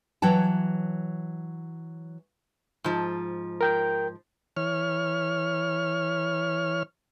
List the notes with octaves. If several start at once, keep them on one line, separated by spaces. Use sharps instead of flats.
E3 F#3 C#5 G5 A5
G#2 F3
A#4 G5 G6
E3 C#5 F6